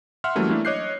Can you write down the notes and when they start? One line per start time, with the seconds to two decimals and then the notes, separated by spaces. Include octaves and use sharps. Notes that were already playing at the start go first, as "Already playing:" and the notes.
0.24 E5 F#5 C6 F6
0.35 E3 F#3 G3 A3 A#3 C#4
0.50 A3 A#3 D4 E4
0.65 C#5 D#5 D6 F#6 G6 C7